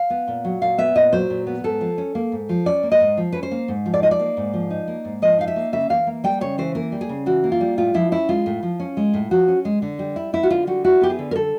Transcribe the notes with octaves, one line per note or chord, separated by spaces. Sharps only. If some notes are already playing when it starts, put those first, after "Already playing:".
Already playing: F5
B3
A#2
F#3
A#2 F5
B3 E5
A#2 D#5
F#3 C5
A#2
B3
G#2 A4
F3
C#4
A#3
G#2
F3
C#4 D5
A#3
D#5
G#2
F3
C#4 B4
C5
A#3
G#2
F3
D5
D#4 D#5
D5
A#3
G#2
F3
D#4
A#3
G#2
F3 D#5
D#4 F5
E5
A#3
C#3 E5
E3 F5
A#3
G3 G5
C#3 C#5
E3 C5
A#3 A#4
G3
G#4
C#3
E3 F#4
A#3
F4
G3
A2 F4
F3 E4
C#4 E4
G#3 F4
A2
F3
C#4
G#3
A2
F3 F#4
C#4
G#3
D3
G3
E4
B3 E4
F#4
D3 F4
G3 F#4
E4 F#4
B3 G4
G#4
D3
A#4
G3 A4